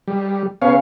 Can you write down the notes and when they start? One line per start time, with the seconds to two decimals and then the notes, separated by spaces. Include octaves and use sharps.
0.08 G3
0.62 C#3 B3 C#5 F5